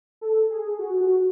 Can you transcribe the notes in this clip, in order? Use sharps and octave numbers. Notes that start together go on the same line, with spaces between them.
A4
G#4
F#4
F#4